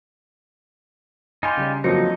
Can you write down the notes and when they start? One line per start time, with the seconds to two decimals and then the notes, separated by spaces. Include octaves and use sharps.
1.43 D#4 F4 G4 G#5 B5 C6
1.58 C#3 G3 C#4
1.84 F2 A#2 F3 F#3 D#4 C#7